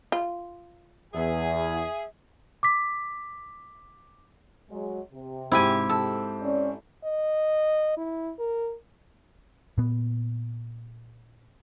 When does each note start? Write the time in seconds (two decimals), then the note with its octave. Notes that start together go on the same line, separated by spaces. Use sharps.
0.12 F4
1.14 E2 G#4 E5
2.63 D6 B6
4.70 F#3 G#3
5.13 C3
5.52 G#2 C4 E4 G4 G#5
5.90 A4
6.41 C#4 D5
7.04 D#5
7.97 E4
8.39 A#4
9.78 A#2 B3